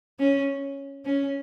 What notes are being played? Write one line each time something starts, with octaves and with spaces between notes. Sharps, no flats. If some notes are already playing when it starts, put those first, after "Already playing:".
C#4
C#4